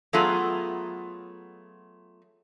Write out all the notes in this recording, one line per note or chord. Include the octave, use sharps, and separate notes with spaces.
F#3 A3 B3 F4 G#4